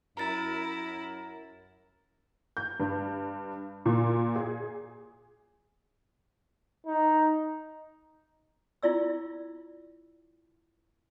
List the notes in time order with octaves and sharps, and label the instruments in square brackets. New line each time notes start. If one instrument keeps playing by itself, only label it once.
[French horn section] F#2 [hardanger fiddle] E4 [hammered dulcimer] A#4 [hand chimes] A#5 A6
[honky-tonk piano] G6
G2
A#2
G#4
[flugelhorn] D#4
[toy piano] E4 F4 D5 E6